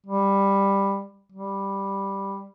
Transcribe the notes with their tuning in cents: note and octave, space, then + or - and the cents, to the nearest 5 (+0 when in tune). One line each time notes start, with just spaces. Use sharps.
G3 +10
G3 +5